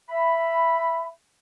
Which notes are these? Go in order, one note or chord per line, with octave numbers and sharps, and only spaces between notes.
E5 B5